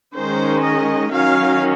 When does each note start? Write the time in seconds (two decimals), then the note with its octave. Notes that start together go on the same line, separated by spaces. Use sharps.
0.15 D#3 G#3 C#4 C5
0.64 D#5
1.13 D#3 F#3 C#4 F5